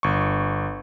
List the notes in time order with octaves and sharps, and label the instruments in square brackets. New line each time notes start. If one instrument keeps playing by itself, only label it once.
[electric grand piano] G1 C#6